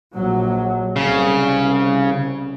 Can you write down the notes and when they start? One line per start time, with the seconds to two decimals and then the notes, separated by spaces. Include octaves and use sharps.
0.13 A#1 F#3
0.96 C2 C#3